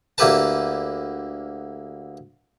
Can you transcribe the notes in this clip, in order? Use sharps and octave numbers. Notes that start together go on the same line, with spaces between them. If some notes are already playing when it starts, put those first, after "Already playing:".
D2 A#3 E4 G4 B4 A5